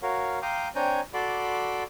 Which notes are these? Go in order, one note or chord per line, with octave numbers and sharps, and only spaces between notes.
F#4 A#4 C#5 F5
F5 G5 A#5 C6 D6 D#6
C4 D4 C#5 G5 G#5 A#5
F#4 A4 D5 B5 C6 D6